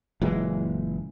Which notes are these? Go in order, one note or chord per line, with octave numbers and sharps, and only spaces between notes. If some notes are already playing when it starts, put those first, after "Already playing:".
F#1 A#2 E3 G#3